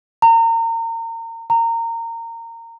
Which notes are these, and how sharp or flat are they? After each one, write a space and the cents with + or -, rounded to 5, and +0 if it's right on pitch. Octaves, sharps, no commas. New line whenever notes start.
A#5 -30
A#5 -20